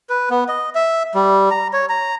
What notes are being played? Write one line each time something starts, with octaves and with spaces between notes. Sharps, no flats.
B4
B3
D#5
E5
G3
A#5
C#5
A#5